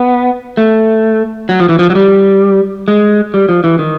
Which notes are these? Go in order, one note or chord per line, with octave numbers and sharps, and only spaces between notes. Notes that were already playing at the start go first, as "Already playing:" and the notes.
Already playing: B3
A3
F#3
F3
E3
F3
F#3
G3
G#3
G3
F3
E3
D#3